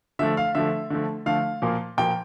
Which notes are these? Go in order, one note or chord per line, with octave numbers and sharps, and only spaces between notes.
D3 F3 A3 E5
F5
D3 F3 A3 E5
D3 F3 A3
D3 F3 A3 F5
A#2 F3 A#3
A#2 F3 A#3 G5